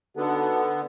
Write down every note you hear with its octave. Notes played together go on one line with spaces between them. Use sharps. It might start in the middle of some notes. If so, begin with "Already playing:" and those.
D3 B3 D#4 F#4 A4